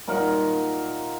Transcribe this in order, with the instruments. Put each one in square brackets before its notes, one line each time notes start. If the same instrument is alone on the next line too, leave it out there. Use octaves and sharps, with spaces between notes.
[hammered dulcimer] A#2 D#4 A#4 F#5